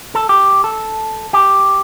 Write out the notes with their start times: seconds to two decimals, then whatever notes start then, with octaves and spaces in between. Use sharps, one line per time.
0.15 A4
0.29 G4
0.64 A4
1.33 G4